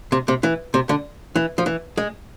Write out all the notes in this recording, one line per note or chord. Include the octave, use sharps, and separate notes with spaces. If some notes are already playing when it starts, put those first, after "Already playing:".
C3
C3
E3
C3
D3
E3
F3
E3
G#3